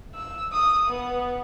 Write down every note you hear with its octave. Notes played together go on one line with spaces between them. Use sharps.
E6
D#6
B3